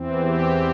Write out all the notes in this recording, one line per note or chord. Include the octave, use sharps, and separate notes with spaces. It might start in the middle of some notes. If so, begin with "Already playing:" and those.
Already playing: E2 E3 C4
G4